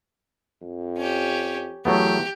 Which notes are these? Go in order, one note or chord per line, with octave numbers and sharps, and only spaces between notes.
F2
C#4 G4
E2 F#3 A3 B3 G4